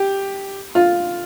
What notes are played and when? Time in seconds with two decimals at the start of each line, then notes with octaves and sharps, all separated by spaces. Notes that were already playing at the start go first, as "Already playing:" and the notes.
Already playing: G4
0.75 F4